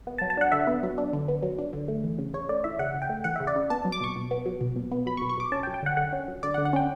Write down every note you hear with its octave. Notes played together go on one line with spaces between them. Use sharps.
B3
A5
F#3
A5
D4 F#5
D3 E5
B3
F#3
D4
D3
B3
F#3
D4
D3
A3
E3
C#3
C#3 C#5
A3 D5
E3 E5
C#3 F#5
C#3
G5
A3
E3 F#5
C#3 E5
D5
C#3
B3 A5
F#3
D6
B2 C#6
B2
B3
F#3
B2
B2
B3
F#3 B5
C#6
B2
C#6
B2 D6
C#4 A5
G5
F#3
G5
D3 F#5
D3 F#5
C#4
F#3
D3 D5
F#5
D3
F#5
C#4 G5